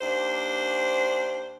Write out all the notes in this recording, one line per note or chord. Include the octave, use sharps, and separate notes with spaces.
D#2 D4 C5